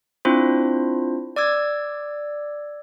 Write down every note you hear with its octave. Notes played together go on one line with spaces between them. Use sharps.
C4 D4 E4 F4 C5
D5 D6 E6 G#6